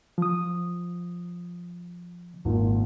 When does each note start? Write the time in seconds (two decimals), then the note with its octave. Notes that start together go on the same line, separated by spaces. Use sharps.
0.18 F3 D#6
2.45 G#1 A#2